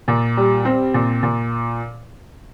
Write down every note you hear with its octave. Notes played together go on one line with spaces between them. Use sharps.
A#2
G3
C4
A#2
A#2